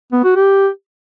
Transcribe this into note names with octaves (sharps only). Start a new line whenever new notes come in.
B3
F#4
G4